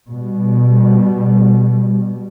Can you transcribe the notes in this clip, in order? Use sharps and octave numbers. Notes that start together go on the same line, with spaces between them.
B2 G3